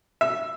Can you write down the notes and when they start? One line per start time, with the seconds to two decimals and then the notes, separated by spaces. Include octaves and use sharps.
0.21 E5